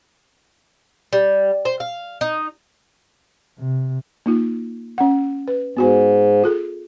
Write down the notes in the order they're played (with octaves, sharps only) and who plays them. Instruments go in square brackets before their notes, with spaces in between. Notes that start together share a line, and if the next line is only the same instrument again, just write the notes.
[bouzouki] G3
C5
F5
D#4
[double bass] C3
[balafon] A#3 D#4 F4
C#4 F#5
B4
[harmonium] G#2 [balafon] B3 F#4 G#5
[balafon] F4 G#4 A4